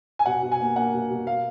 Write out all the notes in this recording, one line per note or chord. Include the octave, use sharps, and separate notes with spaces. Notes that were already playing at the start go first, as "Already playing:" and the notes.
G#5
B2 F#5
B2
G#5
A#3
A#3 F#5
B2
B2
A#3 F5